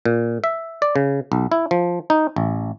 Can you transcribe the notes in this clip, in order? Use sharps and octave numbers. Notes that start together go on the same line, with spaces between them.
A#2
E5
D5
C#3
B1
E4
F3
D#4
A1